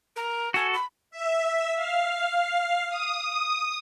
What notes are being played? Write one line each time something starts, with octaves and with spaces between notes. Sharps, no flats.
A#4
F#4 A4 G#5
B5
E5
F5
D#6